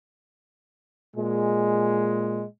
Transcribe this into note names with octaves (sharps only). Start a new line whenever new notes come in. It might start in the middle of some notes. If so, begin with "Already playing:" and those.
A#2 G#3